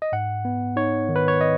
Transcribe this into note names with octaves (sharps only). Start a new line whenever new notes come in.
D#5
G#2 F#5
B3
D#4 C#5
D#3
B4
C#5
D#5